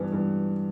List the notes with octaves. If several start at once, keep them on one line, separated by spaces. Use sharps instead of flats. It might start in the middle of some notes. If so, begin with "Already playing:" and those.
Already playing: G2 E3 B3
G2 E3 B3